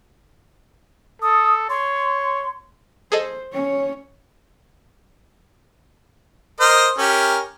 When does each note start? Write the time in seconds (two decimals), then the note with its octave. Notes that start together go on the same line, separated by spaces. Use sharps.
1.22 A4 D#6
1.70 C#5 C6
3.12 G#4 A4 C5 D#5
3.53 C#4 C#5
6.60 A#4 C5 D#5
6.98 C#4 G4 A#4